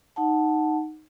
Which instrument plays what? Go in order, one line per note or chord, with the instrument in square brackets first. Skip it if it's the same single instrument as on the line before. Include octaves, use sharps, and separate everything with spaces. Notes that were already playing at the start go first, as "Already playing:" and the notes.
[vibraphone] D#4 F#5 A5